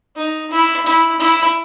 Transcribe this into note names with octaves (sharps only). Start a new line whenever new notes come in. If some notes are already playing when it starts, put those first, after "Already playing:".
D#4
E4
E4
E4